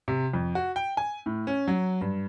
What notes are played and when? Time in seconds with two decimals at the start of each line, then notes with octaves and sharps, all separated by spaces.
0.08 C3
0.33 F2
0.55 F#4
0.76 G5
0.97 G#5
1.26 A2
1.47 C#4
1.68 F#3
2.01 G2